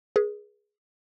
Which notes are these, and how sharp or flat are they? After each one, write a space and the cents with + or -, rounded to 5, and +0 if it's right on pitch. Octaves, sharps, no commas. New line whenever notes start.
G#4 +0 B4 -40